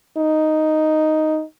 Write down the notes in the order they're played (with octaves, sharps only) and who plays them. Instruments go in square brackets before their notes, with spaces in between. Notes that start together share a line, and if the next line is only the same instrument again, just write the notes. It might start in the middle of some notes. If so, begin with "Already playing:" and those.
[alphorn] D#4